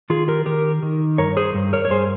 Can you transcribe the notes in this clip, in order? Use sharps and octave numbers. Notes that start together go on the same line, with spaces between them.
D#3 F4 G#4
G4 A#4
D#3 G4 A#4
D#3
G2 A#4 C#5
G#4 C5
G2
A#4 C#5
C#5
G2 G#4 C5